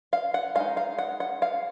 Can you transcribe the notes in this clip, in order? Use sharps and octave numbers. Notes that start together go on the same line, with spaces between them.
F5
F#5
G#3 D#4 F5
F5
F#5
F#5
F5